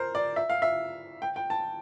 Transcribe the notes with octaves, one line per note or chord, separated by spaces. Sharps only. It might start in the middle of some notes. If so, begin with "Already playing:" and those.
Already playing: A#4 C5
D5
E5
F5
E5
G5
G5
A5